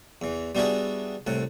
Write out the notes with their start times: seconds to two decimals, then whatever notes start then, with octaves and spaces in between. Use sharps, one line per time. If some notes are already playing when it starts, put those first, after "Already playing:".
0.22 E2 E3
0.55 G3 B3 D4 E4 F#4 G#4
1.27 C2 A2 F#5